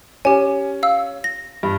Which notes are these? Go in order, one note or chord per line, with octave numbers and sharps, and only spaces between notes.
C#4 G4 G#5
F5 E6
A#6
G2